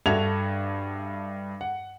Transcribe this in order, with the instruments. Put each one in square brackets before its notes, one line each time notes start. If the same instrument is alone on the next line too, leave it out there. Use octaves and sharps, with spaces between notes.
[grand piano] G2 F#4 A4 E5 G#6 F7
F#5